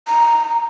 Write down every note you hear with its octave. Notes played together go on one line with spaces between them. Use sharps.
A#5